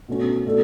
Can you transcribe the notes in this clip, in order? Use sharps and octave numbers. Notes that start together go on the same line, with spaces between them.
B2 A3 C#4
B2 A3 D4 A4